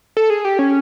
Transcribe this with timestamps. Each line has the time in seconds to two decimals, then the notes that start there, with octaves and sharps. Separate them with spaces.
0.17 A4
0.30 G#4
0.45 G4
0.59 C#4